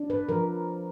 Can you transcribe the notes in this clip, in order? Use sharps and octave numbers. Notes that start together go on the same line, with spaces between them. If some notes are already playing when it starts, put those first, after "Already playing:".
Already playing: D4
B4
F3 A#4